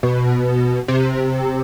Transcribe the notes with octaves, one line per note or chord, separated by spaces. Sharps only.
B2
C3